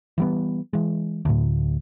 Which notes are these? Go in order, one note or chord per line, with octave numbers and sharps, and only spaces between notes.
E3 G3 B3
E3 G#3
D2 A2